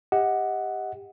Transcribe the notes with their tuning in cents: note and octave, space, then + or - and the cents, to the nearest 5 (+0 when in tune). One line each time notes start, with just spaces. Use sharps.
G4 +20 D#5 +25 F#5 +0